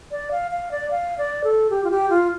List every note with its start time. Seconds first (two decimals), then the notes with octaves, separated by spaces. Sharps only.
0.11 D5
0.31 F5
0.51 F5
0.71 D5
0.91 F5
1.18 D5
1.44 A4
1.70 G4
1.84 F4
1.91 G4
2.10 F4